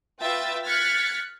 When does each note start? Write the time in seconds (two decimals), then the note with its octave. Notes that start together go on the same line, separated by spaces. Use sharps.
0.22 F4 B4 E5 G5 E6 A6
0.66 F6 F#6 G#6 A6 B6 C#7